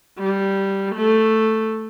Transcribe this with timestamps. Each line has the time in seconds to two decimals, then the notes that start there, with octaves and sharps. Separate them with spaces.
0.18 G3
0.95 A3